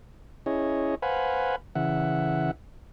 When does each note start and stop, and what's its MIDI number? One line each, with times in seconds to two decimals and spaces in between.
0.46 0.95 61
0.46 0.95 64
0.46 0.95 68
0.46 0.95 73
0.46 0.95 75
1.02 1.56 71
1.02 1.56 72
1.02 1.56 77
1.02 1.56 78
1.02 1.56 80
1.02 1.56 83
1.75 2.51 49
1.75 2.51 52
1.75 2.51 76
1.75 2.51 78